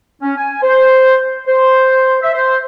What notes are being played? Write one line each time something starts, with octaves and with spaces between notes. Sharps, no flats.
C#4
G#5
C5
C5
E5
C5